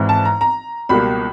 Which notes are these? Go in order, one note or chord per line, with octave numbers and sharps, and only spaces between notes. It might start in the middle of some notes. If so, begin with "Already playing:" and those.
Already playing: G#1 G#2 E3
A5
A#5
A#5
C#2 B2 G3 A#3 B5